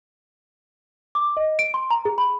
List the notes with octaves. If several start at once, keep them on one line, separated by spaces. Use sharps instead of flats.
D6
D#5
D7
C6
A#5
G#4
B5